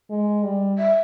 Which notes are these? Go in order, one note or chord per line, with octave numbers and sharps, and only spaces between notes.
G#3
G3
E5